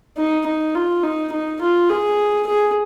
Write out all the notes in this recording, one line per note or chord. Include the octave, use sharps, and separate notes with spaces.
D#4
D#4
F4
D#4
D#4
F4
G#4
G#4